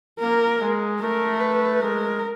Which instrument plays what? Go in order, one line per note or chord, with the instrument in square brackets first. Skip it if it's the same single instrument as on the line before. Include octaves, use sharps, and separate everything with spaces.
[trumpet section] A#3 [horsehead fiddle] A#4
[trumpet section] G#3
[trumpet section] A3 [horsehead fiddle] A#4
[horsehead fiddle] B4
[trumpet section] G#3 [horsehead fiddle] A#4